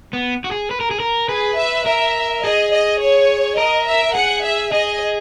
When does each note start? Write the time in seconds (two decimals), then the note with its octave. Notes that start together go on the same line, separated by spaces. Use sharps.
0.13 B3
0.44 F#4
0.51 G#4
0.71 B4
0.81 A#4
0.91 G#4
1.00 A#4
1.28 G#4 B4
1.57 E5
1.86 A#4 E5
2.43 G#4 D#5
2.72 D#5
3.00 C#5
3.57 A#4 D#5
3.86 E5
4.15 G#4 F#5
4.44 E5
4.72 G#4 D#5